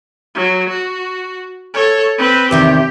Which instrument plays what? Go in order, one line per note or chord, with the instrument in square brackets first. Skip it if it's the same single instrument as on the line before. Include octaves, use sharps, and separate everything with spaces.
[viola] F#3
F#4
A4 C#5
C4 B4
[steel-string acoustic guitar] E2 C3 D#3 [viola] G4